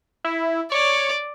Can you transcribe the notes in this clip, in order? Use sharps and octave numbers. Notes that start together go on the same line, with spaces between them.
E4
C#5 D5